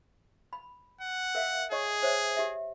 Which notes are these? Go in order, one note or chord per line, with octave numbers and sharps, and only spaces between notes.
B5
F#5
A#4 E5 F5
G#4 C#5 D#5 C#6
C5 C#5 E5
G4 E5